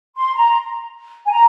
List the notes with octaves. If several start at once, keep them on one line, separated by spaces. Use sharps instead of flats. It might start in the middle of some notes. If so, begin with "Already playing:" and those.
C6
A#5
G#5
A#5